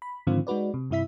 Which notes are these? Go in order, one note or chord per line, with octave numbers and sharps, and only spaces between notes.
B5
G#2 D3 D#3 F3 C4 F4
G#3 D#4 F#4 B4 D5
C3
G2 C3 E4 E5 B6